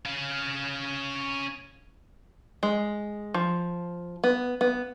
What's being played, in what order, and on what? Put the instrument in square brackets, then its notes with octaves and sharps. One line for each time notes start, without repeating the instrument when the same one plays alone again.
[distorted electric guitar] C#4 F5
[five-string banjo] G#3
F3
B3
B3